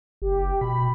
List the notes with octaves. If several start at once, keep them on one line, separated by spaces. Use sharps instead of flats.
F#1 G4
B2 B5